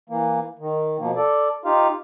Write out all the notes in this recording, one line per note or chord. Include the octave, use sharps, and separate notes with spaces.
E3 A#3
D#3
B2 F3 A#3
A4 D5
D#4 F4 G4 F5